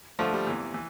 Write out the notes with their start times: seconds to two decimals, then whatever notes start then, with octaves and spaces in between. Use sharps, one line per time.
0.19 G2 D3 F3 A3
0.33 G3
0.47 E2 C3 E3
0.74 E3